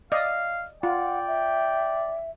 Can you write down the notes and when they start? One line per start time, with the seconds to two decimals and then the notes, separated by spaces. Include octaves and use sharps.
0.12 D5 D#5 F5
0.83 F4 D5 F#5 G5
1.27 E5